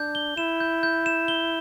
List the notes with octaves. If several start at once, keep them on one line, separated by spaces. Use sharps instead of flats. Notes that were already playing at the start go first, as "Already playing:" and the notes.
Already playing: D4 G6
G7
E4 E7
G6
G6
E7
G7